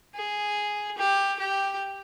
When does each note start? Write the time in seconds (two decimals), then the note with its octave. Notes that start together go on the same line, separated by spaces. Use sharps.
0.15 G#4
0.98 G4
1.39 G4